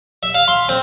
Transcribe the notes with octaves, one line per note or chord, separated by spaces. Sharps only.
E5
F5
C6
C4